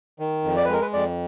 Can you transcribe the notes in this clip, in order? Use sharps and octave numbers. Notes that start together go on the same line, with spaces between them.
D#3
F2
D5
B4
G#3 A#4
B4
F2 D5